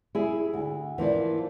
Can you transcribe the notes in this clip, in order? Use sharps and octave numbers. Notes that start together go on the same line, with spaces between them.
E4 G#4
D2
E3 F3 A#3 D5